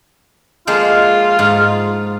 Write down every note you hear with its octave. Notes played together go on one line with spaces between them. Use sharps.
F3 G#3 A#3 F4
G#2